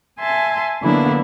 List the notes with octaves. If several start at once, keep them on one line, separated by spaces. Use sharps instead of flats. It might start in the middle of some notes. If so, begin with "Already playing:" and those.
E5 G#5 A5 C6
D3 F#3 A#3 B3 D4 E4